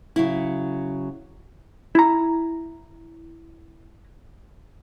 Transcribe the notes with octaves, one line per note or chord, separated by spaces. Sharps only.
C#3 F#3 E4
E4 A#5